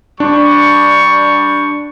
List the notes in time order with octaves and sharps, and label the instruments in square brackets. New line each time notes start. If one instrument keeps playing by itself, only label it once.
[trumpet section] G3 C#6 [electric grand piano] D4